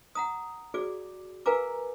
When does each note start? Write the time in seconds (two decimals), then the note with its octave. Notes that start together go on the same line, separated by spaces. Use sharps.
0.15 F#5 A#5 D#6
0.74 F#4 G#4 D5 D6
1.46 A#4 B4 F5 G#5 A#5 D6